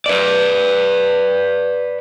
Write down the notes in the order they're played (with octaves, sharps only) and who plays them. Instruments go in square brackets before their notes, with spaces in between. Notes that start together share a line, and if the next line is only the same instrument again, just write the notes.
[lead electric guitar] B4 D5